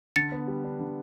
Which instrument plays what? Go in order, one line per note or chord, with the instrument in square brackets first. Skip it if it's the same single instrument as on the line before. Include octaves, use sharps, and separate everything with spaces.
[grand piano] D3 [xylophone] A6 C#7
[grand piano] B3
G3
D4
D3